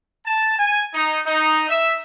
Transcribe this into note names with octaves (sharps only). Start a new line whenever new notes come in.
A5
G#5
D#4
D#4
E5